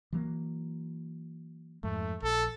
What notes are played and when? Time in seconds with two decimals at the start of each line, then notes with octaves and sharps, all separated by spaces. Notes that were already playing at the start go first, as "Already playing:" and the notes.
0.13 E3 F#3 A#3
1.83 F2 G#2 A3
2.23 A#1 A4